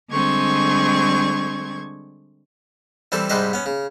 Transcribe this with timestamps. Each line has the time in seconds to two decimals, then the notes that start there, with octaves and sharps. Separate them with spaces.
0.10 D3 G3 G#3 C4 C#6 G#6
3.12 E3 G3 C4 A4
3.30 G#2 C3 G3 B4 C5 D#5
3.53 B3 C#4
3.66 C#3